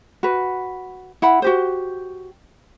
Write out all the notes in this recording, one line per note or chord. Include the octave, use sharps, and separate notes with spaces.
F#4 B4
E4 F#5 B5
F#4 G4 C5